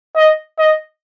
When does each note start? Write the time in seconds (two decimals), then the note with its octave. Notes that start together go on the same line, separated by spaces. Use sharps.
0.16 D#5
0.58 D#5